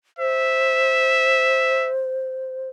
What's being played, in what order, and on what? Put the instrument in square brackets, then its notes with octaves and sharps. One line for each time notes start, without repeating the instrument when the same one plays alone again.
[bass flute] C5 [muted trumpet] E5